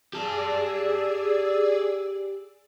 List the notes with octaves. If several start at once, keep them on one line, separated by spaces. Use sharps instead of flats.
G4 G#4 D5 A5 E6